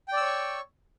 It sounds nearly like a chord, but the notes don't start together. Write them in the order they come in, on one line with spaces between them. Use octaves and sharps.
G5 D5 E6 C#5 C#6